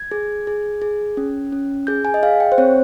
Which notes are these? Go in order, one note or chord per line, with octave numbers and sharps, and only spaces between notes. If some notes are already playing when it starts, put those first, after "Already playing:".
Already playing: G#6
G#4
G#4
G#4
C#4
C#4
G#4 G6
G#5
D#5
G#4 F5
G5
C5
C4 C#5